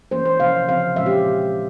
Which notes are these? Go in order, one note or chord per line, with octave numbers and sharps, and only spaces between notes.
E3 A#3 C#4 C5
C5
C3 F3 A#3 C#4 F5
C#3 F3 C4 F5
A#2 G#3 C#4 E5
G4